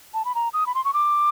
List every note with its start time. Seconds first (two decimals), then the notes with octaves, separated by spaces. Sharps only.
0.14 A5
0.25 B5
0.35 A#5
0.53 D#6
0.67 B5
0.75 C6
0.85 C#6
0.93 D6